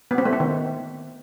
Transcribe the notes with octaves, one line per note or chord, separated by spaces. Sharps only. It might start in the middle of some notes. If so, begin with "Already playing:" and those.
B3
C4
A3
C4
D#3